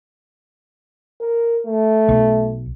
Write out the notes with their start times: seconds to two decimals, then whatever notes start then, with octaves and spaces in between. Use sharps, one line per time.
1.20 A#4
1.66 A3
2.09 B1